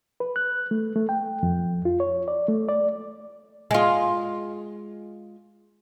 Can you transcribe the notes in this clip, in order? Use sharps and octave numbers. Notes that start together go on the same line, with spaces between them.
B4
F#6
A3
A3
G5
F2
F4
C#5
D5
A3
D5
G#3 F4